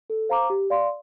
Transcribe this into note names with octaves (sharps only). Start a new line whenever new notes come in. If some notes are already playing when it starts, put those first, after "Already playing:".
A4
C5 F5 A#5 D6
G4
D5 F5 C6